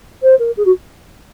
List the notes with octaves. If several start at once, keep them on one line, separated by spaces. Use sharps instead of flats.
C5
A#4
G#4
F#4